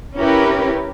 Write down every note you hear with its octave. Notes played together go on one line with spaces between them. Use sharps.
C#4 E4 G4 A#4 B4